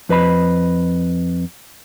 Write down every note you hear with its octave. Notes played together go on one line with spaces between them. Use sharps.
F2 B4 D#5 B5